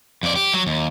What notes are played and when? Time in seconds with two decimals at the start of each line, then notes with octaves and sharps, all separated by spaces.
0.23 F2 D5
0.36 G4
0.54 F#3
0.67 D#2